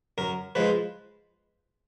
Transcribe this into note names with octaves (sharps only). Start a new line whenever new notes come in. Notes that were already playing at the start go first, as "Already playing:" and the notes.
F#2 A#4
F3 G#3 B4